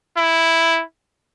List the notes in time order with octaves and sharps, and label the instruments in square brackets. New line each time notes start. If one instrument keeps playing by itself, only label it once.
[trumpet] E4